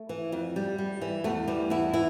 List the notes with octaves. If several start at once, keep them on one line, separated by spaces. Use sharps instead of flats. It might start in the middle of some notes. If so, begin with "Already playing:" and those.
Already playing: A3
E3
F2
G3
G3
E3
E2 A3
E3 G3
E2 E4
E3 E4